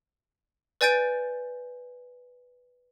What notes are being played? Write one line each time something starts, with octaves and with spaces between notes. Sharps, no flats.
B4 D5 G#5 G6 A6 D7